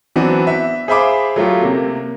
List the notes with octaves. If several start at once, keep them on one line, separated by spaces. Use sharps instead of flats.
E3 F#3 B3 C4 D4 F#4
E5
G#4 C5 E5 F5 B5 D6
F#3 A3 F4 G4
C3 A#3